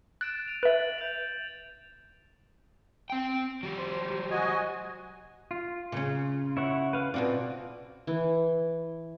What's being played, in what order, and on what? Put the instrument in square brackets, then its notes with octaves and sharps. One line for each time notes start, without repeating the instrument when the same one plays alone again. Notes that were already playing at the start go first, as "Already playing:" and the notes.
[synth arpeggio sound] F#6 [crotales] A6 D7 E7
[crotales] D7 D#7 F7
[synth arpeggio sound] B4 E5 [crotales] A6 F#7
[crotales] G6 D7 F7
[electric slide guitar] C4 G5
F#3 G4
[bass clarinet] C5
[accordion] F#4 D#5 G#5
[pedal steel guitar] F4
[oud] C#3 C#4
[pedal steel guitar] E4 C#5 F#5
B4 F5
[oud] B2 F#4 D5 [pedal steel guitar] C4 F4
[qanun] E3